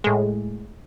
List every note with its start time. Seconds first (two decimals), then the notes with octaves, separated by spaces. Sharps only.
0.04 A2 G#3